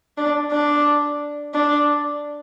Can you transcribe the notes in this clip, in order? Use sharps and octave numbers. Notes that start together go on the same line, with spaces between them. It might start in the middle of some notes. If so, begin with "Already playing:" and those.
D4
D4
D4